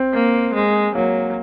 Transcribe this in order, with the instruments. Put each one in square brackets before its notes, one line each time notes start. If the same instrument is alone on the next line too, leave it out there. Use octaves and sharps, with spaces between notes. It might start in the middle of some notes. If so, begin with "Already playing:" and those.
Already playing: [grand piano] C4
[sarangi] A#3
G#3
[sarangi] F#3 [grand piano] A#3